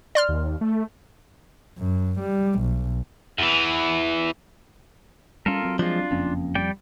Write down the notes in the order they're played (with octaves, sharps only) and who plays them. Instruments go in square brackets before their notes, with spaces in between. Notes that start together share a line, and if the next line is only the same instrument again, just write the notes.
[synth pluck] D5 C6 F6
[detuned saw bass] D#2
A3
[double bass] F#2
G3
B1
[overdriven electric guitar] E2 E3
[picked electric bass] G3 C#4 [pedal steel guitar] F4 A4 A#4
[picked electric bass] F#3 C4
[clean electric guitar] F3 G#3 [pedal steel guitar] D4 F4
[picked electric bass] F#1 A#3 C#4 [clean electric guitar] F2
[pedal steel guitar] G3 D5 G5